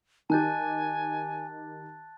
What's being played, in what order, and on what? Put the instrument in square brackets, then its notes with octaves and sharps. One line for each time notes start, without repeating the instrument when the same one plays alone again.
[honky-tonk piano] D#3 G4 [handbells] D#4 G6 [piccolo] G#5 [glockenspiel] A5 F#6 A6